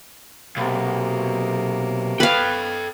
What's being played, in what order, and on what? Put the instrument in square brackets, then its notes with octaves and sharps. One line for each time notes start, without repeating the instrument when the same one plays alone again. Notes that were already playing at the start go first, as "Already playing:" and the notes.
[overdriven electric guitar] B1 [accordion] C3 A#3
[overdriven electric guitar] A4 G5 [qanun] B4 F5